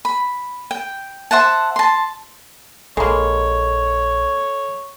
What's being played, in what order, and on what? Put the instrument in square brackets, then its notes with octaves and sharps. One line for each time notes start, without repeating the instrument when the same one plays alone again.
[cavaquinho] B5
G5
C5 E5 F#5 A5
A5 C6
[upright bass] A#1 [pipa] G#3 A#3 [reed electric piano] A4 B5 [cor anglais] C#5